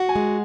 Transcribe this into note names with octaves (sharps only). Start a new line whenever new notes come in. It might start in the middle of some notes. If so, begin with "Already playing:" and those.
Already playing: F#4 F#5
G#5
G#3